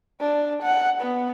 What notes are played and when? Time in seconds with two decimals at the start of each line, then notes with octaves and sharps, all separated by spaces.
0.20 D4
0.63 F#5
1.01 B3